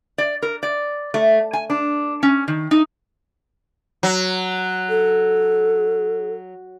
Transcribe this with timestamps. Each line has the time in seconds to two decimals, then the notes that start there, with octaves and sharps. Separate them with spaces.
0.18 D5
0.42 A#4
0.63 D5
1.14 A3
1.53 G#5
1.70 D4
2.23 C#4
2.48 D#3
2.71 D#4
4.03 F#3
4.89 A4